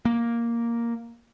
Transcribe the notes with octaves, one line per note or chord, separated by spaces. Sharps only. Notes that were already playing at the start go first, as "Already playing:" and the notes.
A#3